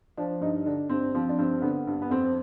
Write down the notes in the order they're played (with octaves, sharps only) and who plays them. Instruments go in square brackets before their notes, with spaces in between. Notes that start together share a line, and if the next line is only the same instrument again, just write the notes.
[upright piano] F3 D4
G2 D#4
D3 D4
G2 C4
F3 C4
D4
G2 C4
D3 B3
G2
B3
F2 C4